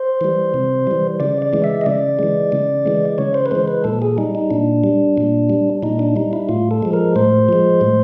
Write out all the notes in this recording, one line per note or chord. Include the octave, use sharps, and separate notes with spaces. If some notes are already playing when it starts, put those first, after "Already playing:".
Already playing: C5
E3 G3
C3
E3 G3
C#3 D5
D5
E3 G#3
E5
D#5
C#3 D5
E3 G#3
C#3
E3 G#3
C#3 C#5
C5
B4
E3 G#3 C5
B4
A#2 A4
G#4
G3 D#4
D#4
A#2 D4
G3
A#2
G3
A#2 D#4
D4
G3 D#4
E4
A2 F4
A4
F3 G#3
A#4
A2 C5
F3 G#3
A2